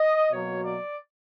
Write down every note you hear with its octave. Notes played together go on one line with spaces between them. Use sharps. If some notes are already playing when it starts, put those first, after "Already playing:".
Already playing: D#5
B2 F#3 A#3 C#5
D5